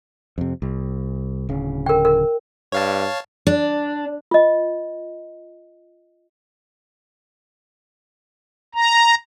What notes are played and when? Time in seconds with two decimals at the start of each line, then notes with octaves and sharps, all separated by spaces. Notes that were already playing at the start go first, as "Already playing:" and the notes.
0.38 F2 C3
0.62 C2
1.49 D1 C#3
1.86 A#4 G5
2.05 A#4
2.72 G2 C#5 F5 A5
3.47 D4
4.31 F4 D#5
8.75 A#5